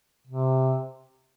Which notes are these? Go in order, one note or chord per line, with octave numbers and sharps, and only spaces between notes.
C3